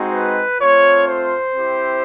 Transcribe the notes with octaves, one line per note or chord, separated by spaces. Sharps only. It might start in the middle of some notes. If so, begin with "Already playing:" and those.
Already playing: G#3 C4 D#4 F#4
B4
A3 C4 F4 C#5
C5
C4 E4 G4